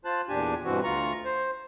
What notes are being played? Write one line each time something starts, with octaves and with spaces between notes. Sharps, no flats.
F4 C5 A5 F#6
E2 A#2 D4 G4 G#5
G2 B2 E3 C4 F#4
D2 F4 A#5 C#6
C5